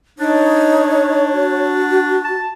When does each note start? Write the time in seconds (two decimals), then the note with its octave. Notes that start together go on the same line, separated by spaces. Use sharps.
0.19 D4 D#4 C#5
1.33 F#4
2.25 A5